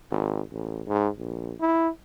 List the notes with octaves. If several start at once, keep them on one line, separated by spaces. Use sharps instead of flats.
G#1
A1
G#2
A#1
E4